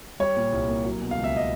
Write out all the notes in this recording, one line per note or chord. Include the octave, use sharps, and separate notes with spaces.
G3 C#5
A#2
C2
A#3
F#3
B2
F5
C#2
E5
D#5